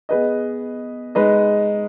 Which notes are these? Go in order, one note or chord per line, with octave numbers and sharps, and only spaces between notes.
B3 G#4 B4 D#5
G#3 D#4 B4 D#5